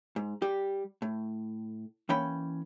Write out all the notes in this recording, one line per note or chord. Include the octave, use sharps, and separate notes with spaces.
G#2
G3 G4
A2
E3 A#3 C#4 G5 B5